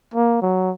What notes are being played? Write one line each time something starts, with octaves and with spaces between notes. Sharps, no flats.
A#3
F#3